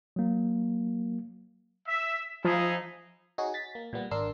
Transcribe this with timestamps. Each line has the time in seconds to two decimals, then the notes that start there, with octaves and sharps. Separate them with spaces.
0.16 F#3 A#3
1.88 E5
2.45 F3 D#4 E4 G#4
3.38 D#4 F#4 G#4 C#5
3.54 A6 B6
3.75 A#3
3.93 A#2 G3 B3
4.11 G#1 D4 A#4 C6 E6